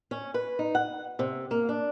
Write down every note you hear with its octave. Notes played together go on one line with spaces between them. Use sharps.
C#4
B4
D#4
F#5
C3
A#3
D4